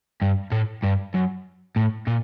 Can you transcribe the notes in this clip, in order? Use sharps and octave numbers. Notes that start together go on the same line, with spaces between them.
G2
A2
G2
F#2
A2
A#2